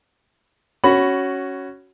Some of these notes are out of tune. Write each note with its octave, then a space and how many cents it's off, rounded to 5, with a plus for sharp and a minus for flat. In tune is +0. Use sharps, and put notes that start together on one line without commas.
C#4 +0 F#4 +10 B5 +0